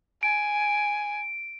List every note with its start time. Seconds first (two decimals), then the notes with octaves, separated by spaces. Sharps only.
0.23 G#5 D7